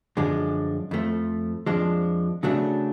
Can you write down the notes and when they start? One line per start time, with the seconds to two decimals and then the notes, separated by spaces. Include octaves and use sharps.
0.17 F#2 D3 F3 G#3 D4
0.91 F2 F3 A3
1.66 F2 F3 G#3 D4
2.43 C#3 F#3 A3 D4